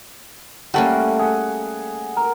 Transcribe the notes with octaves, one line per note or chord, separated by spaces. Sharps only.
G3 A3 A#3 C#4 A4 F#5
G#4 F#5
A#4